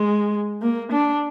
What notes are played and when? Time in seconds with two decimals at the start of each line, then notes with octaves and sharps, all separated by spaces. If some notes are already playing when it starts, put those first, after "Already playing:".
Already playing: G#3
0.62 A#3
0.92 D4